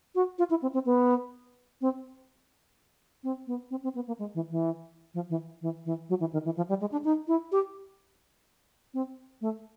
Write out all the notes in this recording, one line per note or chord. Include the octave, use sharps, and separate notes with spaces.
F#4
F4
E4
C4
C4
B3
C4
C4
B3
C4
C4
B3
A#3
G#3
E3
E3
F3
E3
E3
E3
F#3
E3
D#3
E3
F3
G3
G#3
D4
D#4
E4
G4
C4
A3